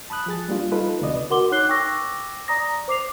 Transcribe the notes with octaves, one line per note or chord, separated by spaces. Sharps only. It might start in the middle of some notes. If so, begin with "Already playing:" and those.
A5 B5 D#6 F#6
F3 G#4 A6
G3 A#3 D4 F4
D#4 F4 A4 B4
D2 C3 B4 D5 D#5
F#4 A#4 F#5 C6 D6 G7
D#4 C#5 D6 F#6 C7 G7
G5 C#6 D6 E6 A#6
D5 A#5 D#6 A#6
C5 D6 C7 F7